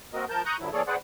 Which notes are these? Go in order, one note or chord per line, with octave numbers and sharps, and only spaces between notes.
A#3 C4 F#4 A#4 D#5
F3 A#4 A5 G6
A#5 C#6 D#6 F#6 G6
G2 D3 F3 F#3 E4
E3 A#3 G#4 A4 C#5 D5
G#4 B4 C5 D5 F#5